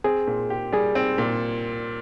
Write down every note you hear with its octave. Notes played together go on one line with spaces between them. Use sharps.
C4 G#4
A#2
G4
G3 G#4
C4
A#2